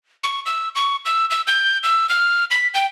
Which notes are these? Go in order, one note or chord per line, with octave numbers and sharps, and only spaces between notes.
C#6
E6
C#6
E6
E6
G6
E6
F6
B6
G5